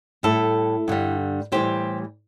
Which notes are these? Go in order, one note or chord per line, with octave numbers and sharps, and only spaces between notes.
A2 G3 E4 A4
G2 D3 G3
A2 E3 G3 G4 C5